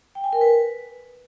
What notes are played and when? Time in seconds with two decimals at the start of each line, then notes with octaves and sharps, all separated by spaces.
0.15 G5
0.24 G#5
0.33 A#4
0.41 B4